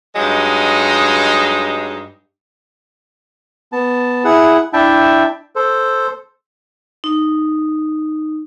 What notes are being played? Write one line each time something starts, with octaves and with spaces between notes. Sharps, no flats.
G2 F#3 G#3 D#4
B3 A5
E4 G#4 F#5
D4 E4 E5 G5 A5
A4 C5
D#4